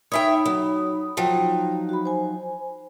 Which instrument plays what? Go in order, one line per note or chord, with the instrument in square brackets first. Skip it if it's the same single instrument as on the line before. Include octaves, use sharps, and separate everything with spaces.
[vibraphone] D#4 B5 D#6 [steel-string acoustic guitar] C#5 E5 G5
[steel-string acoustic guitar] F#3
[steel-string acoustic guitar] F3 F#3 D#4 [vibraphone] G5
[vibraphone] F#4 B5
C5 G#5